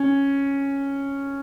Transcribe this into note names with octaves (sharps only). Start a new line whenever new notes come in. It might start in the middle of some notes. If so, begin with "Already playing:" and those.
Already playing: C#4